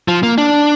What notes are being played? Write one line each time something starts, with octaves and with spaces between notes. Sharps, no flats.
F3
A#3
D4